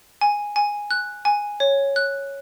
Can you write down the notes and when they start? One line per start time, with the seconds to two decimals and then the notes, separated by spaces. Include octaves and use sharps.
0.21 G#5
0.56 G#5
0.91 F#6
1.25 G#5
1.60 C#5
1.96 F#6